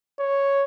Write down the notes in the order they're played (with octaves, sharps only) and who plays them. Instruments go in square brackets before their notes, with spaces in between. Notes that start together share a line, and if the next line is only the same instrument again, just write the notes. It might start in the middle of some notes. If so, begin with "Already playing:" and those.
[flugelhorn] C#5